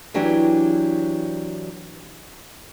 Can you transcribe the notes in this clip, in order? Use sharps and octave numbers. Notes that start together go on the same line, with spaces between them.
E3 F#3 D4 G4